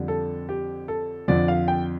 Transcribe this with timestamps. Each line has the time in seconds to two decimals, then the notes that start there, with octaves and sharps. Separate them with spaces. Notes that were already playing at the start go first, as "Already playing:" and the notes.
Already playing: F2 D3 G3
0.08 A4
0.49 G4
0.88 A4
1.28 F2 D3 F3 D5
1.48 F5
1.68 G5